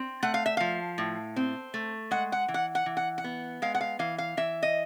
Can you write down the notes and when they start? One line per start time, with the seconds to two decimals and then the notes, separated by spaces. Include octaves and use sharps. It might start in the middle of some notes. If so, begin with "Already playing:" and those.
Already playing: C4
0.23 A3 F#5
0.34 F5
0.46 E5
0.57 F3 F5
0.98 A2
1.36 C4
1.74 A3
2.11 G#3 F#5
2.32 F#5
2.48 E3
2.54 F#5
2.75 F#5
2.86 E3
2.97 F#5
3.18 F#5
3.24 B3
3.62 G#3 F5
3.75 F#5
3.81 F5
3.99 E3 F5
4.18 F5
4.37 E3 E5
4.63 D#5